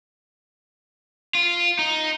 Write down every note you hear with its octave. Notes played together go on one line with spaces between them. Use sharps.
F4
D#4